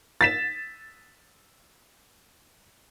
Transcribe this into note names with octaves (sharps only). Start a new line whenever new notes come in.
A6 B6 E7